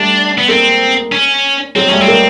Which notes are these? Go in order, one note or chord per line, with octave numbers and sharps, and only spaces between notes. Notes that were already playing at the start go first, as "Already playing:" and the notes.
Already playing: G3 A3 D4
B3
G#3 A#3 C4
C#4
F#3 G#3 C4
G3 A3 C#4
C4
G#3 A#3